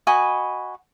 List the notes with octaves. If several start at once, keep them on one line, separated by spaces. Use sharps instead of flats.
F#4 D#5 G#5 B5